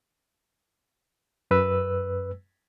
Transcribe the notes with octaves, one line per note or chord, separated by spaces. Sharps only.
F#2 B4 E6